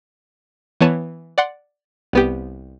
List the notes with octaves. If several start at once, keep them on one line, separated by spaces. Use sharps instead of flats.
E3 B3 C#5 A5 D#7
D5 F#5 C6
C2 B3 G4